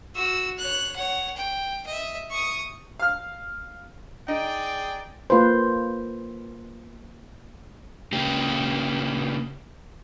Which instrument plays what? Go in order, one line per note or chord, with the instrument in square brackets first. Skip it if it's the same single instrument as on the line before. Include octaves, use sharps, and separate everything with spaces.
[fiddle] F#4 E6
C#5 F#6
C#5 F#5
G5
D#5 E5
C#6 D#6
[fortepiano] F5 F6
[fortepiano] D#4 [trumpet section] G#4 D5 G5
[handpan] A#3 F4 B4 C5
[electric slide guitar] C#3 A#3 G4